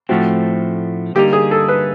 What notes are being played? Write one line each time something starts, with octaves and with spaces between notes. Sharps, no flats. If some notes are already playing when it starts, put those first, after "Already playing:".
A2 F3 A3 C4 F#4
D3 G3 A#3 D#4 G4
G#4
A4
B4